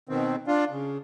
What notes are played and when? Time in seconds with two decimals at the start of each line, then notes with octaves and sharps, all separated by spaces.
0.09 B2 D#3 C4
0.47 D4 F4
0.70 C#3